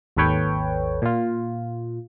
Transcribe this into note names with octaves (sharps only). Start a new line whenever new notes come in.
G#1 D#2 A4 B4 C#5 G5
A#2 F4